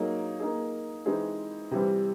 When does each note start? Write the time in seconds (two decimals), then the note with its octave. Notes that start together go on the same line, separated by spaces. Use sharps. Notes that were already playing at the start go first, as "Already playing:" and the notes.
Already playing: F#3 A#3 D#4 G#4
0.40 A#3 D#4 G#4
1.06 E3 G#3 C4 D#4 G#4
1.71 C3 E3 G3 C4